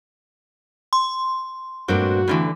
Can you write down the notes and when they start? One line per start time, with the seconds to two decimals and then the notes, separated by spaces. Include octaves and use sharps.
0.93 C6
1.88 G2 A#2 A3 C4 D4 F#4 A#4
2.28 G2 D3 E3 A3 C4 D4